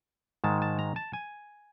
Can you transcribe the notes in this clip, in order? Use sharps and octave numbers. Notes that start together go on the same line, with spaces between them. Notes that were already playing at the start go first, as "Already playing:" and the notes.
G#2 D#3 G#3 A5
A5
A#5
A5
G#5